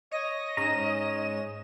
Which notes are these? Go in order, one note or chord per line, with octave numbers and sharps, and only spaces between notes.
C#5 D#5 A#6
G#2 C#4 A#5 E7